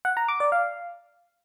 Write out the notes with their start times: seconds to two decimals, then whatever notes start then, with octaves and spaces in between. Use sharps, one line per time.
0.05 F#5
0.17 A#5
0.28 D6
0.40 D5
0.52 F5